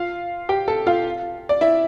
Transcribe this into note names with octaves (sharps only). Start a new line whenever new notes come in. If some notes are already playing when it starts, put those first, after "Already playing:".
Already playing: F4 F5
G4 G5
A4 A5
F4 F5
D5
E4 E5